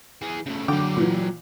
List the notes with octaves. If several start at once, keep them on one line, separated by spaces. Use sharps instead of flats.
E3 G#4
C#3 A3
D3 F#3 G5 D6
A#2 E3